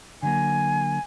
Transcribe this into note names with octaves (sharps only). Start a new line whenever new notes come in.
D3 F#3 A#3 G#5